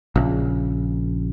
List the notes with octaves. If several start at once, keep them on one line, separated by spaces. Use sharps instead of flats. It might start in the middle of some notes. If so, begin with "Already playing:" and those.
A#1 C#3